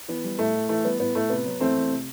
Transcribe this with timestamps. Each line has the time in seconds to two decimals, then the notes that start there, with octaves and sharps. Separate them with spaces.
0.08 E3 B3
0.24 G3
0.39 A2 A3
0.54 A2
0.69 E3 A3
0.85 G3 B3
1.00 A2 B3
1.15 A2 A3
1.30 C3 B3
1.45 F#3
1.60 E2 A3 C4
1.75 E2
1.91 C3